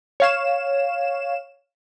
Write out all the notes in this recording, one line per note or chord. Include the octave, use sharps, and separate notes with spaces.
C#5 F5 E7